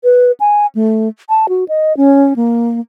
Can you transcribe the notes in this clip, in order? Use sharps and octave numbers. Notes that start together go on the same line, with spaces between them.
B4
G#5
A3
A5
F#4
D#5
C#4
A#3